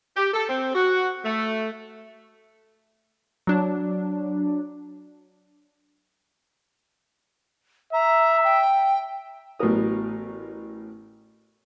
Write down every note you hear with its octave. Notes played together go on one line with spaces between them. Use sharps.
G4
A4
C4
F#4
A3
F#3 D4
E5 A#5
G5
A1 A2 F#3 B3 A#4 D#6